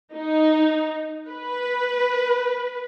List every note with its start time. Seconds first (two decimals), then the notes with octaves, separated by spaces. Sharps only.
0.14 D#4
1.28 B4